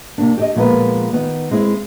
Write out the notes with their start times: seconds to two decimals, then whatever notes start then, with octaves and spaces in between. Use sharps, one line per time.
0.18 C3 A#3 D4
0.37 G4 D5 D#5
0.56 A#2 F3 G#3 B3 A#4 B4
1.13 D#3 B3
1.51 G#3 C4 E4 G#4